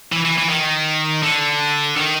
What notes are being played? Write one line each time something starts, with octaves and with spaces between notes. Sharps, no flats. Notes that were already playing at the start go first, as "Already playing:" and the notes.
E3
E3
E3
D#3
D3
D#3